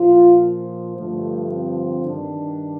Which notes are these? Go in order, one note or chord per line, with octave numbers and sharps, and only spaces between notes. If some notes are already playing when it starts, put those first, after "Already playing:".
Already playing: A#2 F3 F4
G2 D3 F3 A3
C4
G2 D#3 D4